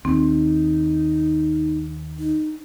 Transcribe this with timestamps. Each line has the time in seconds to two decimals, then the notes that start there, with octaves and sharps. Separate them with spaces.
0.05 D#2 C4 D#4
2.19 D#4